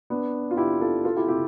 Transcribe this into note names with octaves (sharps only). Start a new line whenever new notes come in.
B3 D4
F4
E4 G4
F4 A4
F4 A4
E4 G4
E4 G4